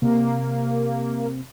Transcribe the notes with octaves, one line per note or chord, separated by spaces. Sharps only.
C3 A#3